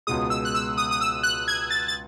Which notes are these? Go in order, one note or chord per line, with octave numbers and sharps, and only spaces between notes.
C#2 B2 G#3 D#6
E6
F#6
E6
D#6
D#6
E6
F#6
G#6
A6
A6